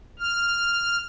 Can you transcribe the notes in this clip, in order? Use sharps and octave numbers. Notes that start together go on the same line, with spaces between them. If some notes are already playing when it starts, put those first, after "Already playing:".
F6